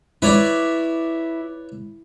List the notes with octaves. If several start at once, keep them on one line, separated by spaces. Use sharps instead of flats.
E4 B4 C#5 D5